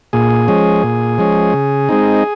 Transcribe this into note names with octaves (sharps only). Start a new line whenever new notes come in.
A#2 G#4
F3 G#3 C#4
A#2
F3 G#3 C#4
C#3
G#3 C4 D#4